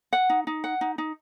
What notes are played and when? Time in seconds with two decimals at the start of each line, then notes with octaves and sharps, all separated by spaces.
0.13 F#5
0.30 D#4
0.47 D#4
0.64 F#5
0.81 D#4
0.98 D#4